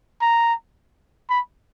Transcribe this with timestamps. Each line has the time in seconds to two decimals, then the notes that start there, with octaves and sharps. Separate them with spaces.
0.21 A#5
1.29 B5